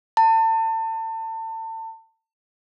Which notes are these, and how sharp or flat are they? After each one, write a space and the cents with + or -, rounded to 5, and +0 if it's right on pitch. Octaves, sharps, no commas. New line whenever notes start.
A5 +35